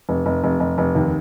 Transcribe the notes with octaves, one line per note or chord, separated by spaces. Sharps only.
F1
F1
F1
F1
F1
D#2